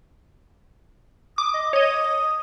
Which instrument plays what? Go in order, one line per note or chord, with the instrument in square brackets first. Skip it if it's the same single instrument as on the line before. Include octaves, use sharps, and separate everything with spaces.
[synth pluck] D6 [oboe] D#6
[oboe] D#5
[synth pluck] C#5 D#5 [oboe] D#6